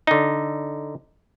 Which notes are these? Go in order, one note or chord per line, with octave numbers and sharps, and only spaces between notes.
D3 D#4